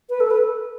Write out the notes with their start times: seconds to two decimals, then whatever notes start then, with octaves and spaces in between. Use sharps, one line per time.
0.10 B4
0.20 A4
0.31 B4